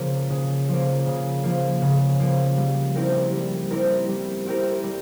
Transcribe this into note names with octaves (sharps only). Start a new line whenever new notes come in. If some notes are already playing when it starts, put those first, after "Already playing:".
Already playing: C#3 F3 A#3
C#3
F3 A#3
C#3
F3 A#3
C#3
F3 A#3
G3
C4 E4 G4 A#4
G3
C4 E4 G4 A#4
G3
C4 E4 G4 A#4
G3